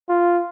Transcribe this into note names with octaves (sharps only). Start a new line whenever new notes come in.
F4